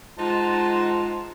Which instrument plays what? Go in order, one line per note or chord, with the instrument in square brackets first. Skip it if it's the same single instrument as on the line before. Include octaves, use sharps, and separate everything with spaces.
[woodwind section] G#2 G#3 F4 [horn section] D#4 F#5 A5